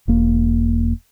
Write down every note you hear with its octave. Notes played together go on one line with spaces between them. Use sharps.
E1 A#3